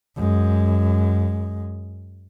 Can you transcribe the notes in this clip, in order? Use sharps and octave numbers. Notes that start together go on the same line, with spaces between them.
F#2 G#3